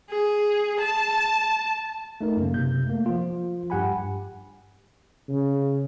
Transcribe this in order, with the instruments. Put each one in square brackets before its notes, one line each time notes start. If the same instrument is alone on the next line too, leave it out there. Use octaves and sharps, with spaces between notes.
[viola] G#4
A5
[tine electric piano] A3 D#4 A#4
F#2 C#3 A#3
C3 G6
A3 A#3
F3 F4
G2 G4 F#5 G#5 B5
[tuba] C#3